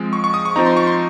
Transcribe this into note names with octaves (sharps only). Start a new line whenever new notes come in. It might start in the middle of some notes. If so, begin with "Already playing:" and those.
Already playing: F3 G#3 C4
C#6
C#6
D#6
C#6
F3 C4 D#4 A#5
C6
C#6
C6